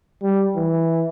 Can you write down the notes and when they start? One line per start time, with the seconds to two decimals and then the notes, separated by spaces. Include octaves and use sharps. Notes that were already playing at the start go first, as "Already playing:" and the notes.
0.22 G3
0.56 E3